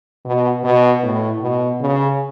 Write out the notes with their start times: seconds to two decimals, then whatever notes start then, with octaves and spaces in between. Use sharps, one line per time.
0.25 B2
0.64 B2
1.03 A2
1.41 B2
1.80 C#3